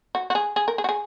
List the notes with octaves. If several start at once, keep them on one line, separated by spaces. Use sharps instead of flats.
F#4
F#4
G#4
G#4
A#4
G#4
F#4
G#4